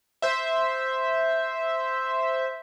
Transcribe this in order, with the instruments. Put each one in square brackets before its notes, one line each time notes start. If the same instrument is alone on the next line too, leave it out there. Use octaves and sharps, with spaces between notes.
[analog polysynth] C5 E5